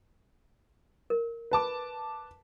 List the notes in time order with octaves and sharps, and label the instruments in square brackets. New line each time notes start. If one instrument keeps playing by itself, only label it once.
[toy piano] A#4
[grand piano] B4 A5 D6